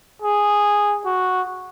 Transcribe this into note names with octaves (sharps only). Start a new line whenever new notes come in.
G#4
F#4